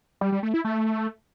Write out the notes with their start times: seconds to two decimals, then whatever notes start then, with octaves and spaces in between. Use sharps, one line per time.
0.21 G3
0.32 G3
0.43 A3
0.54 E4
0.65 A3